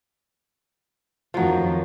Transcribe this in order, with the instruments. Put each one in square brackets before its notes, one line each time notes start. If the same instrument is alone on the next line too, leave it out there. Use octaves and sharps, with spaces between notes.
[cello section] F2 D#3 [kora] F3 F#3